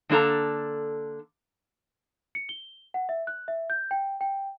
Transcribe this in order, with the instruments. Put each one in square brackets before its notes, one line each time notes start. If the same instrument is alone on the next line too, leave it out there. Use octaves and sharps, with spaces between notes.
[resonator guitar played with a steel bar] D3 A#3 D4 A4 A#5
[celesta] C#7
G7
F#5
E5
F#6
E5
G6
G5
G5